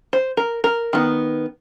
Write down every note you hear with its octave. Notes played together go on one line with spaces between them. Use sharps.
C5
A#4
A#4
D#3 B3